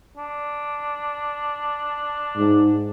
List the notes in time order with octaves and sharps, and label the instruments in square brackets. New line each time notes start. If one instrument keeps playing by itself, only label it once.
[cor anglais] D4
[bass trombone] G#2